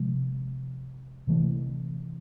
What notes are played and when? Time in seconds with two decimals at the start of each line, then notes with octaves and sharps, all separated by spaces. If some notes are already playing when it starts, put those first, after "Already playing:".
Already playing: C3 F3 G#3
1.27 C3 E3 A3